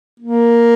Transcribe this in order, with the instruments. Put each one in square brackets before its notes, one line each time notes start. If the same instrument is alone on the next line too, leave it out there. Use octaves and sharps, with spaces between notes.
[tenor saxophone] A#3